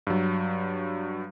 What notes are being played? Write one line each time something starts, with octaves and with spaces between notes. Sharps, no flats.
G2 F#3